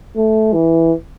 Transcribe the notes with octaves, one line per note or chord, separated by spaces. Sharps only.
A3
E3